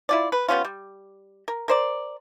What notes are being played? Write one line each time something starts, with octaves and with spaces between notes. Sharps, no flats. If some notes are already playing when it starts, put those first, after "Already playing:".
E4 F4 D5
B4
G3 B3 C#4 F4
G3
A#4
A#4 C5 D5